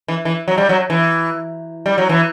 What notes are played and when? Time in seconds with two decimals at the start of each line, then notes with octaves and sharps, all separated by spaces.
0.08 E3
0.25 E3
0.48 F#3
0.58 G3
0.69 F#3
0.90 E3
1.86 G3
1.98 F#3
2.09 E3